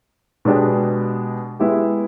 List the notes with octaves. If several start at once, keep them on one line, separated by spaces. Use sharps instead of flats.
B2 G#3 B3 D4 G4
G#3 B3 E4 G4